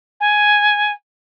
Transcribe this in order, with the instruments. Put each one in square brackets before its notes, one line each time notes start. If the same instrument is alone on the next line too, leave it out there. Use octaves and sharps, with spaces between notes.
[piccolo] G#5